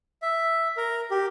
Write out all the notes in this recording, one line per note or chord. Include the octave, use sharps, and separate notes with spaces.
E5
A#4
G4